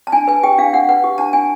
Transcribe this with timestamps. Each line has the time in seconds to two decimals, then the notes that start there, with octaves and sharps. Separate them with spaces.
0.07 A5
0.12 D4 G#5
0.28 B4 G#5
0.43 G4 G5
0.58 D4 F5
0.73 D4 F#5
0.89 B4 F#5
1.04 G4
1.18 D4 A5
1.33 D4 G#5